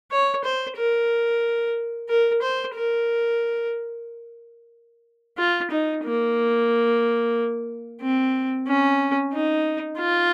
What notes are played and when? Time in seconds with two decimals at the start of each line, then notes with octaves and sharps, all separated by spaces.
0.11 C#5
0.44 C5
0.77 A#4
2.09 A#4
2.42 C5
2.75 A#4
5.38 F4
5.71 D#4
6.04 A#3
8.01 C4
8.67 C#4
9.33 D#4
9.99 F4